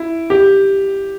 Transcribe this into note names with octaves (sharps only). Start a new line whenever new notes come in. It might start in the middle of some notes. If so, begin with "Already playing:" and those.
Already playing: E4
G4